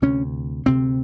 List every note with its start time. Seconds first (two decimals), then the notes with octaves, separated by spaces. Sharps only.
0.02 D2 C3 C#4
0.66 D2 C3 C4